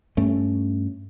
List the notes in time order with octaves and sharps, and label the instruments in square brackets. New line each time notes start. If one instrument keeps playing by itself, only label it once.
[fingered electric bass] G2 A3 C#4